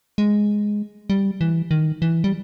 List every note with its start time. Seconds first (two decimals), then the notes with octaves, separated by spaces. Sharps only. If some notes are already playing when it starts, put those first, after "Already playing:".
0.18 G#3
1.10 G3
1.41 E3
1.71 D#3
2.02 E3
2.24 G3